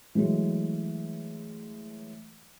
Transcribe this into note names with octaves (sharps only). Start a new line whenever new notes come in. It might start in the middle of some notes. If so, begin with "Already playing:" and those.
E3 F#3 G#3 A3